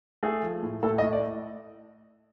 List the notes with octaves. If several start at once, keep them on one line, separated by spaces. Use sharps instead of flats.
A3 G#4
F3
A2
A2 A4
D#5
A2
D5